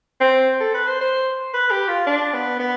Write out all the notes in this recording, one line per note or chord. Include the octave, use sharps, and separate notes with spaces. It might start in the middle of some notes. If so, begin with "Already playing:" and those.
C4
A4
B4
C5
C5
B4
G4
F4
D4
B3
B3